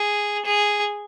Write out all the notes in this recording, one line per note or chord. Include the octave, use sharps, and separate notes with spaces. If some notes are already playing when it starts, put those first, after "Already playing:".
Already playing: G#4
G#4